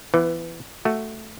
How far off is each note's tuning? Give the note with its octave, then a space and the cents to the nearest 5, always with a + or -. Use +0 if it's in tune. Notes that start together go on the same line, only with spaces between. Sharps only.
E3 +20 B3 +0
A3 +0 F#4 +0